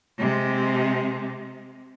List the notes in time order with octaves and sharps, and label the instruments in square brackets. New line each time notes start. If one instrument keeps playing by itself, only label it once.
[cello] C3 G#3